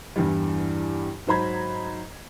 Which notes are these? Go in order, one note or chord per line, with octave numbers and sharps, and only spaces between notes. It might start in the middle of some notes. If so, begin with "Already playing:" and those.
E2 G2 E3 G3
G#2 F#3 C5 A#5 B5 G#6